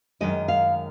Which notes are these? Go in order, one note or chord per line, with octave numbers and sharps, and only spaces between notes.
F#2 D#3 G#3 D#5
F5